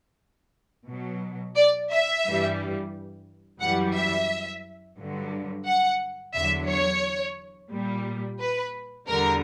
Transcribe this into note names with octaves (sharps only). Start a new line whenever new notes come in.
B2 F#3
D5
E5
G2 E3 G3
F#2 E3 G3 F#5
E5
G2 D3 F#3
F#5
E2 D3 F#3 E5
C#5
A#2 G3
B4
E2 D3 G3 A#4